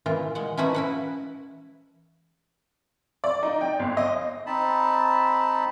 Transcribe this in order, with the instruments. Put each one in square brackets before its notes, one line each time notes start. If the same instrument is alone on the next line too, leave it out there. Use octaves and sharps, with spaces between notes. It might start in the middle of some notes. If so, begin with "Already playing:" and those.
[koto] A#2 E3 F4
G#3 F#5
E3 F3 C#4 D#4 B4 A#5
E4 B4 F#5
[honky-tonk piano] D5
D#4
G5
G1
D#5
[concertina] C4 D#4 A5 B5